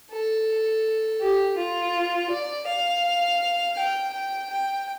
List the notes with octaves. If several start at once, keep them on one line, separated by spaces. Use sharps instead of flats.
A4
G4
F4
D5
F5
G5
G5
G5